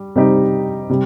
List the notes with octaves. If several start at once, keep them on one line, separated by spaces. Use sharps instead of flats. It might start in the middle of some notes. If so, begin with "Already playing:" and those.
Already playing: G3
C3 G3 C4 D#4 G4
C3 G3